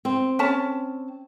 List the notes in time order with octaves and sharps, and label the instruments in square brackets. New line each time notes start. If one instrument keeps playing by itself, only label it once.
[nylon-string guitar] C4
[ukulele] C#4 A5